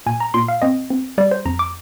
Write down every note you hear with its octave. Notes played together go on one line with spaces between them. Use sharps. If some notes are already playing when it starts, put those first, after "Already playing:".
A#2 G#5
A#5
A#2 C6
F5
C4 D#5
C4
G3 D5
C5
F2 A#5
D6